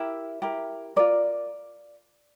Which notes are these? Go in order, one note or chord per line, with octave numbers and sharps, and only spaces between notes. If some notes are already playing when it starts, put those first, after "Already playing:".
Already playing: E4 G4 A#4 E5
E4 G4 A#4
F4 A#4 D5